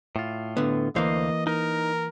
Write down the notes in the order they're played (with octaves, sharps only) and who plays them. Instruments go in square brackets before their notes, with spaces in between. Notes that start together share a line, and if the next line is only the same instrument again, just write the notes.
[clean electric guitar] A2 F4
[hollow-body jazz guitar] D3 B3
[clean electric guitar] D2 C5 F5 [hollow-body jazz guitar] E3 A#3 [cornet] D#5
[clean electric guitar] D#4 [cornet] A#4